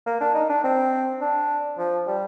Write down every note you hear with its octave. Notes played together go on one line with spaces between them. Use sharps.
A#3
D4
D#4
D4
C4
D4
F3
G3